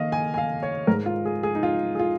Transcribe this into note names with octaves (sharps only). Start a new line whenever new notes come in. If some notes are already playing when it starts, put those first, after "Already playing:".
Already playing: D#3 A#3 D#5 F5
G#5
G#5
F5
C#5
G#2 G#3 A#4
F4
G#4
G#4
D#4
F4
G#4
F4